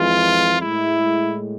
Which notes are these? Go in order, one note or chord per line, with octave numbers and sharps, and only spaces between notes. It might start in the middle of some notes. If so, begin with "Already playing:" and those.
Already playing: F2 E3 G#3 F4
A2 G#3 E4